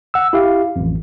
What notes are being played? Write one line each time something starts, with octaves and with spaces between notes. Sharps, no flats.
F#5 E6
E4 G4 F5
A1 F2